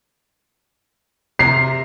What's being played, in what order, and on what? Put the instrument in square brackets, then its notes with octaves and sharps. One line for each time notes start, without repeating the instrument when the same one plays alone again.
[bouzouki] C3 A#4 [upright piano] C7